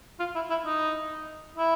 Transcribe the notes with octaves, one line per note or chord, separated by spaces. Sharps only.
F4
E4
E4
D#4
E4